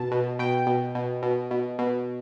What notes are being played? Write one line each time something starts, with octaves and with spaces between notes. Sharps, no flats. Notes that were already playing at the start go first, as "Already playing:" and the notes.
Already playing: B2 A5
B2
B2 G5
B2
B2
B2
B2
B2